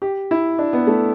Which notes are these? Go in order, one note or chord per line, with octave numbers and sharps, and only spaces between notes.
G4
E4
D4
B3
A3